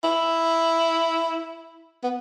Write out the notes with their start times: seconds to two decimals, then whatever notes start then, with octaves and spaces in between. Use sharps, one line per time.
0.03 E4
2.03 B3